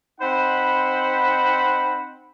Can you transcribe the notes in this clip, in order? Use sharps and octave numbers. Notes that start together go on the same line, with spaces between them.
C4 D#4 C5 F#5 B5